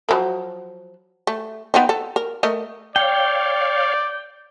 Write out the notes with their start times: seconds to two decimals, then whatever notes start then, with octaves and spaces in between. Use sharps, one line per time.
0.09 F3 F#3 A#3
1.27 A3
1.74 B3 C4 D#4
1.89 A4
2.16 A#4
2.43 A3 A#4 D#5
2.96 C#5 D5 F5 G5